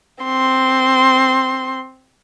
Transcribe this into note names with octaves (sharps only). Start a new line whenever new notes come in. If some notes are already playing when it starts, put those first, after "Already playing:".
C4 C6